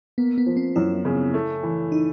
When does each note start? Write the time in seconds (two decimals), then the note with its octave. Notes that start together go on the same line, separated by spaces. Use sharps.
0.18 A#3 B3
0.38 B3
0.46 F3
0.57 C4
0.76 F#2 E4
1.05 C#3
1.34 A3
1.63 E3
1.92 D#4